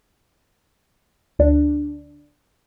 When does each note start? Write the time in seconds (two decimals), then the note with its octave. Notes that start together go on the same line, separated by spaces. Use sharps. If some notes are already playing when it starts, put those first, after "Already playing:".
1.39 D2 D4